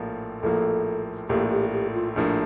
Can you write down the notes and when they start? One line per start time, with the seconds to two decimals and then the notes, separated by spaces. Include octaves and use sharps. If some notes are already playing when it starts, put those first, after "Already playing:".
Already playing: A#1 A2 F3 A#3
0.42 A#1 A2 F3 A#3 A4
1.29 A#1 A2 F3 A#3 G4
1.50 G4
1.72 G4
1.93 F4
2.16 A#1 A2 F3 A#3 D4